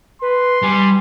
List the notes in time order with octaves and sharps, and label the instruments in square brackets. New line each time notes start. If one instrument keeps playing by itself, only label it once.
[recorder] B4 [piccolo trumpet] C6
[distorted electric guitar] G3 [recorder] G#5